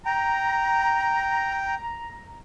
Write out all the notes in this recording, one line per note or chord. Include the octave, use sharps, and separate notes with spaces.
G5 A#5